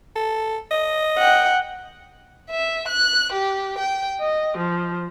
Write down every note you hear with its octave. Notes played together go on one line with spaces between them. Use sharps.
A4
D#5
F#5 G5
E5
F#6
G4
G5
D#5
F3